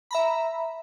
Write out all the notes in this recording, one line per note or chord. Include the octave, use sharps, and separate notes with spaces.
E5 A#5 B5